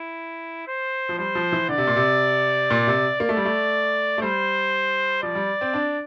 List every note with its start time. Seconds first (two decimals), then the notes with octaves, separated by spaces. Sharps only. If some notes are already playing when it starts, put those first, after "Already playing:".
Already playing: E4
0.67 C5
1.09 F3
1.18 G3 C5
1.35 F3
1.52 E3
1.69 D3 D5
1.78 C3
1.87 A#2
1.96 C3
2.70 A#2
2.87 C3
3.20 A#3 D5
3.29 A3
3.37 G3
3.45 A3
4.18 A3
4.22 G3 C5
5.23 F3 D5
5.35 G3
5.61 C4
5.74 D4